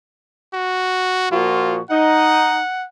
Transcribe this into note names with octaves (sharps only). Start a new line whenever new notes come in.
F#4
A#2 F3 F4 F#4
D#4 F#5